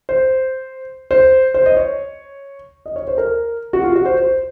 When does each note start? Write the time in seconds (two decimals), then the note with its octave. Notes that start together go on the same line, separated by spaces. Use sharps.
0.09 C5
1.11 C5
1.54 C5
1.66 D#5
1.77 C#5
2.86 D#5
2.96 C#5
3.08 C5
3.18 A#4
3.73 F#4
3.84 F4
3.96 F#4
4.06 C5
4.17 C5